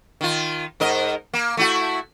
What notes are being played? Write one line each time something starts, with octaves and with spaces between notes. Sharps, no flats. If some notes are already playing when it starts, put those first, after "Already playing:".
D#3 F4
G#2 A#4 D#5
A#3
A3 E4 F#4